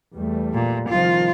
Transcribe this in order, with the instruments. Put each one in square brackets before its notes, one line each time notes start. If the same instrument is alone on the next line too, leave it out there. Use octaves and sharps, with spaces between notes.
[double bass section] E2 G3 A3
[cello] A#2
[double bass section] C2 D#3 F3 [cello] F4